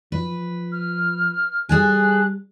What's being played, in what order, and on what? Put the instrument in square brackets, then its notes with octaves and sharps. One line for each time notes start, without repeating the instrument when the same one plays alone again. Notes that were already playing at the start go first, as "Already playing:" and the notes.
[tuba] F3 [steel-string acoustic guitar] B4
[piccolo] F6
[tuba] G3 [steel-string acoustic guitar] G#4 A4 G#5 [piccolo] F#6